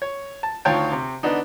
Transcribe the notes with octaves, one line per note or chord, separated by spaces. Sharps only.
C#5
A5
D2 D#3 F4 C#5 G5 A5
C3 C4
D3 B3 D4 D#4